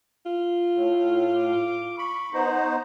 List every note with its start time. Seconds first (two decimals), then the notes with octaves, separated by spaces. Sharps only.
0.26 F4
0.74 A2
1.36 D6
1.98 B5 C#6
2.33 B3 D#4 C5 A#5